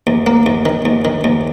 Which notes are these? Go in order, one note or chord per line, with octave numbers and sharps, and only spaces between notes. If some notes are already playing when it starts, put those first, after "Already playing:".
D#2
A#3
D#2
D#3
D#2
D#3
D#2